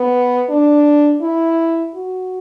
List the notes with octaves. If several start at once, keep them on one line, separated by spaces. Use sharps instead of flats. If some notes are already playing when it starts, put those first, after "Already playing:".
Already playing: B3
D4
E4
F#4